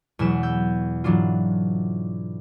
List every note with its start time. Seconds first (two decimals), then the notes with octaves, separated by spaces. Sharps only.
0.19 E2 B2 F#3 G#3 B4 E7
0.43 E6 G6
1.04 G#2 E3 F#3 D4 F4